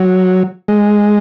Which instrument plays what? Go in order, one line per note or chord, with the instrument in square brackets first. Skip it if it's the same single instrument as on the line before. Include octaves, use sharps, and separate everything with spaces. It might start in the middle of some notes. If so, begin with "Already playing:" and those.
Already playing: [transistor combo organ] F#3
G#3